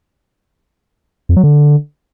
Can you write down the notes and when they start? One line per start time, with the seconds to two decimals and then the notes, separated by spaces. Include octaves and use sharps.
1.29 F2
1.36 F#3
1.44 D3